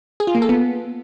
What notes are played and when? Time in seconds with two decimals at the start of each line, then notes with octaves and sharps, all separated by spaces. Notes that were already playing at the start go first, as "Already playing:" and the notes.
0.20 G#4
0.27 F4
0.35 A#3
0.42 A4
0.49 B3